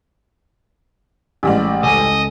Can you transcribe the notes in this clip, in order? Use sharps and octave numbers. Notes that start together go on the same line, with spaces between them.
A1 G3 G#3 D5
C#2 A4 D#5 G#5